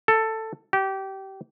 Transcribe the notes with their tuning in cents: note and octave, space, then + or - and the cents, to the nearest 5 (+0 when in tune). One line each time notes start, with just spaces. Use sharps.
A4 +10
G4 -25